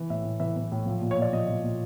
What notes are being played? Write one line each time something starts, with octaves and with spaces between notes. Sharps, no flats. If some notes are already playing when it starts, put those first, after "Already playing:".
Already playing: E3
A2 E5
A2
E3 E5
E3
A2
F3
A#2
C#5
A#2 D5
F3 D#5
F3
A#2